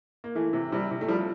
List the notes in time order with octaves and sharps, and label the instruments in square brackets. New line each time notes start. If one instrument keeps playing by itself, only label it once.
[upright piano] A#3
E3 A3
C3
C3 G3
C3
A3
F3 G3